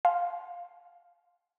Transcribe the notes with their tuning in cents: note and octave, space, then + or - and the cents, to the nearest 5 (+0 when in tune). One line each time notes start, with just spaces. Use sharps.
F5 +0 A5 -45 C6 +0